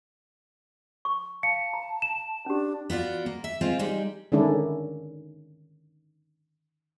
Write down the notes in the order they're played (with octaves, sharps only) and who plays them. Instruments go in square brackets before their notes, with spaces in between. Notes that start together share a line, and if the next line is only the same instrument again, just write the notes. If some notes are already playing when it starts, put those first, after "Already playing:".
[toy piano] C#6
[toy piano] F5 [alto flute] A5 [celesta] C#7
[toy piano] A#5
[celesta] E7
[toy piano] C#4 G4 [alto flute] D4
[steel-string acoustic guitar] B3 F4 F#4 D5
A#3
E5
G#3 C4 F4 C5
G3 G#3 D#4
[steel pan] D3 D#3 G#3 C#4 D4 E4